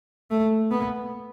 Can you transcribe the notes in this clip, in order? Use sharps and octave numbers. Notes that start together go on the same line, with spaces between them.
A3
B3